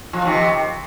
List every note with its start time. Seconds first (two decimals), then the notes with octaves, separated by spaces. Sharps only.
0.13 F3
0.25 C3 D#3